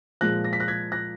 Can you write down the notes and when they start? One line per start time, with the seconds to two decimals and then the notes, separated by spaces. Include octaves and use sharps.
0.21 A#2 F3 G#3 F#6 A#6
0.44 A#6
0.53 B6
0.60 F#6 A#6
0.68 G#6 B6
0.92 F#6 A#6